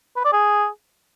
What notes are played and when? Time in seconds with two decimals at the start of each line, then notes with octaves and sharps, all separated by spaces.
0.16 B4
0.24 D5
0.33 G#4